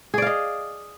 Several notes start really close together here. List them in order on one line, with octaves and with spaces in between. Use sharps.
G#4 D5 F5 D#5